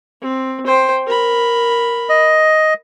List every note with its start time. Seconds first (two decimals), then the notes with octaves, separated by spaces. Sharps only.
0.22 C4
0.67 C5 G5
1.07 A#4 B5
2.09 D#5